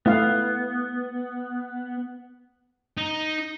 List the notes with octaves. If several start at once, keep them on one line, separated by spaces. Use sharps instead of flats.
A3 B3 E4 F5
D#4